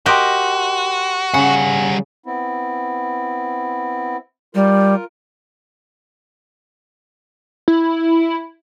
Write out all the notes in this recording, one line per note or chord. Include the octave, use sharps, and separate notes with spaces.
F#4 G4 A#4 D#5 G5 C6 F#6
C#3 G3 F#5 G#5 F#7
B3 C4 E4
G3 F4 A#4
E4